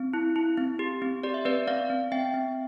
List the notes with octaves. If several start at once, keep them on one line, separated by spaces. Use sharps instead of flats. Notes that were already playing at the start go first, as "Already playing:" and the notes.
Already playing: C4
E4
E4
C4
G4
C4
G4 D5
E5
C4 B4 D5
C4 D5 F5
C4
C4 E5 G5
C4